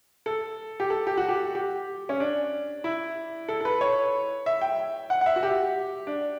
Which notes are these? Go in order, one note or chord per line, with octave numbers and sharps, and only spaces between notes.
A4
G4
A4
G4
F#4
G4
G4
C#4
D4
E4
A4
A4
B4
C#5
E5
G5
F#5
F#5
E5
F#4
G4
D4